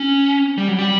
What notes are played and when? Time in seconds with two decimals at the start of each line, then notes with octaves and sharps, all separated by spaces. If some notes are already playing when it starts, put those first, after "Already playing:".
Already playing: C#4
0.58 G3
0.68 F#3
0.79 G3